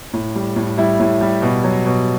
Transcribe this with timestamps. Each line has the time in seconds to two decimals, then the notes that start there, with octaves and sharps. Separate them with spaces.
0.13 A2
0.35 G3
0.56 A2
0.78 G3 E4
1.00 A2
1.21 G3
1.42 B2
1.64 F#3
1.86 B2